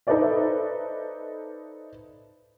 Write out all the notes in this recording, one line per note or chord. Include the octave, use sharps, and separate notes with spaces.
D#4 A4 B4 C5 D5 E5